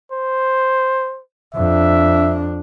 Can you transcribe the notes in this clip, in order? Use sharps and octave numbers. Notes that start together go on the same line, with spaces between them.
C5
F2 D4 E5